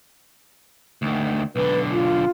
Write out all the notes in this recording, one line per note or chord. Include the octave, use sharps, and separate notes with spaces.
D2 D#3
B1 D3 B4
F4